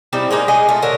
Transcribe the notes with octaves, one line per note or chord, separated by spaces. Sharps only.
G3 C4 D#4 E4
G#3 A#3 D#4 D5
G#3 G#4 D#5
A3 F4
A#2 D3 A#4 C#5